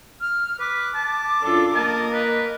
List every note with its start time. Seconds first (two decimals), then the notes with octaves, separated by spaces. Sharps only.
0.21 F6
0.59 B4 D6
0.94 A5
1.41 F#2 D4 F4 A4
1.75 A#3 A#4 D#5 A5
2.13 B4